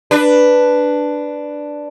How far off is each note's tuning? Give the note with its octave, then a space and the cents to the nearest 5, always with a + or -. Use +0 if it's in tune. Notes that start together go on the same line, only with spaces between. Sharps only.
D4 +0 B4 +0